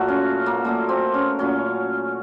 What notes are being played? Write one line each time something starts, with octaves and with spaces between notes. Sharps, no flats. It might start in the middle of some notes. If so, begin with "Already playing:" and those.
Already playing: A#2 F#3 A3 F#4
C#4
A#3
A#2 F#3 A3 A#3
C4
C#4
A#2 F#3 A3 C#4